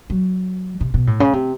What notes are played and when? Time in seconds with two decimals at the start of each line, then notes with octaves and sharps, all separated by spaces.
0.10 F#3
0.81 C3
0.94 B2
1.07 A2
1.20 C#3
1.33 C3